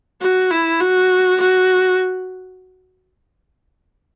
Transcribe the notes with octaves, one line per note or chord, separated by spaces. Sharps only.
F#4
E4
F#4
F#4